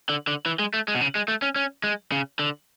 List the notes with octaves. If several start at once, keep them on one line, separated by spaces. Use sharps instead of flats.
D3
D3
E3
G#3
A3
G#3
B2
C#3
G#3
A3
C#4
C#4
G#3
C#3
D3